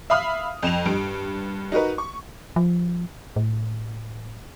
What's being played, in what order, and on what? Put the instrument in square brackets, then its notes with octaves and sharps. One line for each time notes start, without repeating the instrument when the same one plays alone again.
[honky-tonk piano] E5 F5 B5 D#6 F6
F2 E7 F7
G2 D7
D#4 F#4 A#4 B4
C#6
[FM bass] F3
A2